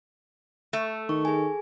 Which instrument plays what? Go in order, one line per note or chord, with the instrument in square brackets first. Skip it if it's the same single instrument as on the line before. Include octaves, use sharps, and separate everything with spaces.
[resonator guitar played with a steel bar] A3
[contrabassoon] D#3 [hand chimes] C#6
[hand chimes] G#4 G#5